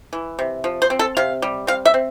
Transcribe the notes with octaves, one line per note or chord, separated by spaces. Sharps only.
E3
C3
F3
C5
C4
A4
C3 F5
G3
C4 F5
E5
C4